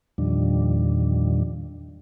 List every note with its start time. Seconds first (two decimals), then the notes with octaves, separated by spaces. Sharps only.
0.18 E2 A#2 D#3 F3 G3 D4